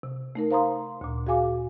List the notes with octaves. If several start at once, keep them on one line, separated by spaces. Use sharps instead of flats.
C3
A3 D#4 A#4
C5 F5 A#5 C6 D#6
D2 A#2
F#4 G#4 F5 G#5 D6